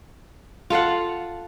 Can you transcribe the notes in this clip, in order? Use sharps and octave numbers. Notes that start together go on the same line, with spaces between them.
F4 A4 F5 F#5